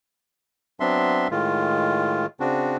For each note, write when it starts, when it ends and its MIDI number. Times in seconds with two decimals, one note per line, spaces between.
0.80 1.28 54
0.80 1.28 59
0.80 1.28 60
0.80 1.28 62
0.80 1.28 76
0.80 1.28 84
1.31 2.26 45
1.31 2.26 51
1.31 2.26 56
1.31 2.26 65
2.40 2.77 49
2.40 2.77 60
2.40 2.77 62
2.40 2.77 66